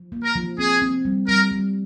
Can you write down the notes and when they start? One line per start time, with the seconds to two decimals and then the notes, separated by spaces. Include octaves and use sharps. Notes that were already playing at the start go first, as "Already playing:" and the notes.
Already playing: F3
0.12 A#3
0.23 A#4
0.35 F3
0.59 C4 G#4
0.82 C4
1.05 G3
1.28 G3 A#4
1.52 G3